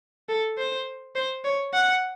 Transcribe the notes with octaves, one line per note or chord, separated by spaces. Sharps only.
A4
C5
C5
C#5
F#5